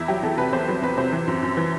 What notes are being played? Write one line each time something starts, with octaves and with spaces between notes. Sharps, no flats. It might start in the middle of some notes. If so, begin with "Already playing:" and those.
Already playing: E2 E4
F#3 G4
E2 A4
C3 B4
E2 C5
F#3 B4
E2 B4
C3 C5
E3
F#2
F#2
E3